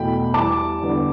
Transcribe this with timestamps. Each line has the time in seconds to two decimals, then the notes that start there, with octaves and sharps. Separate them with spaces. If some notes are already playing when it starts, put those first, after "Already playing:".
Already playing: E2 B2 A3 G5 B5
0.34 E2 E3 G3 A5 D6
0.81 E2 D3 G3 B3 D4